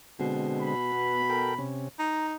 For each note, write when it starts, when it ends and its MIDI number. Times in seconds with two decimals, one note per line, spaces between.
0.20 1.64 47
0.20 0.74 50
0.20 0.74 56
0.20 0.74 60
0.60 1.66 83
0.92 1.22 59
1.30 1.55 69
1.30 1.55 70
1.30 1.55 79
1.58 1.88 48
1.58 1.88 61
1.99 2.36 63
1.99 2.27 82